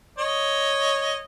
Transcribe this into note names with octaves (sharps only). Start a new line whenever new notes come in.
C#5 D#5